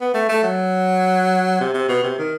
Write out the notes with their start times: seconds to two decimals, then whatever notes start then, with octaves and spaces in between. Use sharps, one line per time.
0.01 B3
0.14 A3
0.29 A3
0.43 F#3
1.60 C3
1.74 C3
1.88 B2
2.03 C3
2.18 D#3